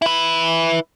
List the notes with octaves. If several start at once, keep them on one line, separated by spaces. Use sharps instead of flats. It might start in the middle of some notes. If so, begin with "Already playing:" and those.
E4 B4